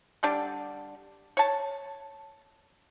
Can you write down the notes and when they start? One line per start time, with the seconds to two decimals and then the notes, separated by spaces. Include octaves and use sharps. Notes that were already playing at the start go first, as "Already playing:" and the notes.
0.23 D3 G3 D4
1.37 C#5 A5